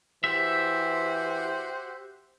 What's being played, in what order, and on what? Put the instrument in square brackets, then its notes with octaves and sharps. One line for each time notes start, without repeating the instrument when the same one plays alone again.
[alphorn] E3 [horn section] F#4 G4 C5 [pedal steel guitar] E5